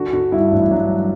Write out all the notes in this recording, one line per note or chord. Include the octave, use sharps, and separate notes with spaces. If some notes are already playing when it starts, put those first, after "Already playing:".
Already playing: D3 F#4
D3 F#4
G2 E4
A1 D4
E4
F#3 D4